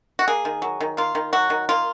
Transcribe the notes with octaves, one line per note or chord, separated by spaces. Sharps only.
F#4
A#3 G#4
D#3
F#3
D#3
A#3 F4
D#3
F#3 F#4
D#3
A#3 F4